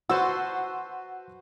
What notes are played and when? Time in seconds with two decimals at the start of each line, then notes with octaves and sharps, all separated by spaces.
0.10 F#4 B4 C5 F#5 A5 C6 E6